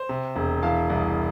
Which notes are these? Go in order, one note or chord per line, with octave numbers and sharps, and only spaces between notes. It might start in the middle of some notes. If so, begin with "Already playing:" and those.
Already playing: C5
C3
E1
E3 F5 A5
C2